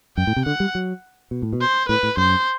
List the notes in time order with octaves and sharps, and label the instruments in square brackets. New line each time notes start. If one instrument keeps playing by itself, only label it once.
[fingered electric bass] F#2 [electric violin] G5
[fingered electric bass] A2
C3
[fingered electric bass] D3 [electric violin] F#5
[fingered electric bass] G3
F#3
B2
A2
B2
[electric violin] C5
[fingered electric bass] A2 [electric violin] B4
[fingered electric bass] A2
[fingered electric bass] F#2 [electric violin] C5